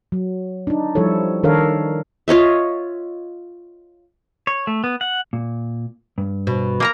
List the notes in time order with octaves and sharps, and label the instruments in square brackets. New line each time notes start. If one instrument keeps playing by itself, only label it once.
[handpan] F#3
D4 D#4
F3 G3 E4 A4 C#5
D#3 D4 A4 A#4 C#5 F5
[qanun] F4 C#5 D#5 E5
[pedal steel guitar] C#5
A3
B3
F#5
[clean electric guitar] A#2
G2
[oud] B2
[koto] A#3 A#4 A#5